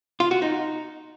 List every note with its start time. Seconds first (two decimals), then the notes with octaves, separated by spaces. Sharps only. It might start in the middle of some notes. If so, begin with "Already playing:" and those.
0.20 F4
0.31 F#4
0.42 D#4